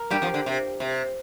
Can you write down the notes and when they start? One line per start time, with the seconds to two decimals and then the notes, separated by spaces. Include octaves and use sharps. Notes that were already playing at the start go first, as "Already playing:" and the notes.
Already playing: A#4
0.10 G2 G3 G4
0.22 F2 F3
0.34 D3
0.46 C3
0.80 C3